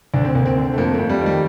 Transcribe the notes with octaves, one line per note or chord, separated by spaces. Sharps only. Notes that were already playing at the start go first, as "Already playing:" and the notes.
D2 D4
C4
D2 A#3
C4
D3
A3
F2 A#3
F2 A3
G3
D#3
G3